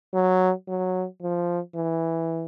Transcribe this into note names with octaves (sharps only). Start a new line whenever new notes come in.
F#3
F#3
F3
E3